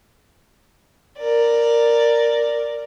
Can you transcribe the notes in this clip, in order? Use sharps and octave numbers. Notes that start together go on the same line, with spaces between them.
A#4 D5